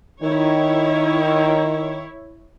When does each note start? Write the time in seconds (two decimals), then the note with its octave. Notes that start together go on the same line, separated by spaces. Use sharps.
0.22 D#3 E4 C#5